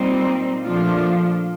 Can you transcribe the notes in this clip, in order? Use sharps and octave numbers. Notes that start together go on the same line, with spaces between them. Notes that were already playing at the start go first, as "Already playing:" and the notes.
Already playing: A#2 G3 C4 D#4
A#2 F3 A3 D4 F4